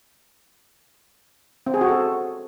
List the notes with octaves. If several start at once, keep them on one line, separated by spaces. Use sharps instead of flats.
C4
G#4
F#4
A4